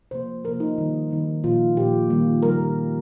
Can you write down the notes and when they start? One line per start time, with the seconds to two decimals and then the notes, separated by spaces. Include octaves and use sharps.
0.11 C3 F3 A#3 C5
0.44 C3 F3 A#3 A#4
0.60 D#4
0.77 D#3 G3 A#3
1.10 D#3 G3 A#3
1.43 A#2 F3 A#3 F4
1.76 A#2 F3 A#3 G4
2.10 D#3 G3 A#3
2.43 D#3 G3 A#4